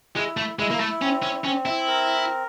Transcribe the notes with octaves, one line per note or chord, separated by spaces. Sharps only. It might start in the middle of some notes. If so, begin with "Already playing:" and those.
G#3 E4
A3
G#3 E4
A#3
A3
C4 C#4
C#4
C4 C#4
E4
A#4